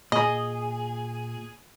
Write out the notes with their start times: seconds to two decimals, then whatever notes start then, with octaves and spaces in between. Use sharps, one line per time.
0.12 A#2 G#4 D#5